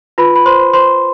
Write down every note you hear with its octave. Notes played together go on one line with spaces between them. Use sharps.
F4 B4 B5
B5
C5 C6
C5
C5 C6